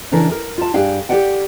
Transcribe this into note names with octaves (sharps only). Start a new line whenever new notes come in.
C#3 E3 D4 A#4 B4
A#4
F4 A5
G2 D4 G4 G#4 F5 G5
G4 A4 D5 F#5 G5